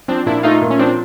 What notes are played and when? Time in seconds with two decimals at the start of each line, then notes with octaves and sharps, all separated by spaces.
0.08 F3 C4 D4
0.26 A#2 D4 E4
0.43 A3 D#4 F4
0.61 A#2
0.70 C#4
0.79 F3 C4 D4